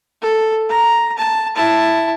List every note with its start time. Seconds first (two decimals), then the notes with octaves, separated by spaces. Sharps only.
0.22 A4
0.69 A#5
1.18 A5
1.56 E4 A5